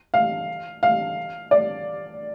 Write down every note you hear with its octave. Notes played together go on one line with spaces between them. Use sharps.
F5
F5
D5